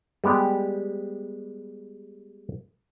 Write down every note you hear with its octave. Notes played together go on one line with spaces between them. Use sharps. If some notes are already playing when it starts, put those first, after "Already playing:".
G3 G#3 B3 G4